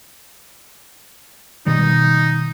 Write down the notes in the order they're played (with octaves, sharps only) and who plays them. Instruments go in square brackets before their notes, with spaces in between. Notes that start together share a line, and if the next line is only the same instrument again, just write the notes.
[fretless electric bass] B2 D#3 G3 [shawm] D#4